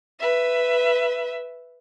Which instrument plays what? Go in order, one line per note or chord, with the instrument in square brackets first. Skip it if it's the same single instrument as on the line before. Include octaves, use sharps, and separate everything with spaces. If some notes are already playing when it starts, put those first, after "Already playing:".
[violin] B4 E5